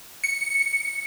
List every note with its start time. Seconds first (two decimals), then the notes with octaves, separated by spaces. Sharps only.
0.24 C#7